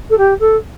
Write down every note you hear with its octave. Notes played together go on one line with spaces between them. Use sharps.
A4
G4
A4